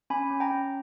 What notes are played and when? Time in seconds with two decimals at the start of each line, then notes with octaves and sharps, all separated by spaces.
0.10 C#4 G#5 B5
0.31 C#4
0.40 G5 A#5
0.51 C#4